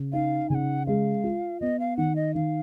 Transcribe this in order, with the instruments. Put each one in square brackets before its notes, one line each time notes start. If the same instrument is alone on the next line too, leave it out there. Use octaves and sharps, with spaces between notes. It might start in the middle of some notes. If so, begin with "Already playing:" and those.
Already playing: [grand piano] C#3
[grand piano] D#4 [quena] F5
[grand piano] C#3 [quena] F#5 G#5
[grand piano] G#3 [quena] F5
[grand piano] F4
[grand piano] B3 [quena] D#5
[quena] F5
[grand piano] D#3 [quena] F#5
[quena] D#5
[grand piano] D#3 [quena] F5